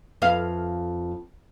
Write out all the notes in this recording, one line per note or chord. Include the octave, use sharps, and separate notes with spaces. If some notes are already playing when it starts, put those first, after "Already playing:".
F2 B4 F5